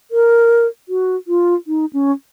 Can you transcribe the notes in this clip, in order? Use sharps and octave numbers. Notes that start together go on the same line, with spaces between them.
A#4
F#4
F4
D#4
C#4